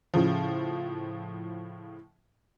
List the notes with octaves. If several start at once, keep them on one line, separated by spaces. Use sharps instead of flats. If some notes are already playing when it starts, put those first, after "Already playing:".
A2 C#3 F3